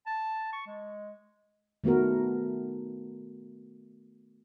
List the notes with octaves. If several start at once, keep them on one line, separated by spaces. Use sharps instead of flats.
A5
C#6
G#3
D#3 A3 B3 F#4 A#4